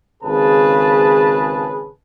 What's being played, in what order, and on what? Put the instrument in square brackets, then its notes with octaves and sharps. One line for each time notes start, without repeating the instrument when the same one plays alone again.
[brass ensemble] G#1 C#3 G#4 B4 A5